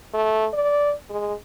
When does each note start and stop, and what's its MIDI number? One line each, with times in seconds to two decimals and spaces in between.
0.13 0.47 57
0.53 0.93 74
1.10 1.33 56